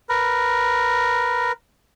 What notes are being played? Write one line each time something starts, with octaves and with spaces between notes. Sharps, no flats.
A#4 B4